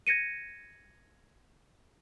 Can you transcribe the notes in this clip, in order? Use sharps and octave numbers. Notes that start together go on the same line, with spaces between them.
G#6 A#6 C#7 D#7